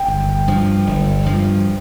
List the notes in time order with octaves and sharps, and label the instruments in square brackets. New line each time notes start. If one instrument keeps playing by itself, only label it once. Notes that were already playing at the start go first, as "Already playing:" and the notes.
Already playing: [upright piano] G5
[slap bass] G1
G2 F3
G1
G2 F3